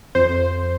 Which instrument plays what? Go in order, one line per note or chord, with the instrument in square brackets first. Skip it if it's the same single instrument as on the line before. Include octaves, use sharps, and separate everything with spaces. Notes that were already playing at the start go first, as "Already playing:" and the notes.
[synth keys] F2 C5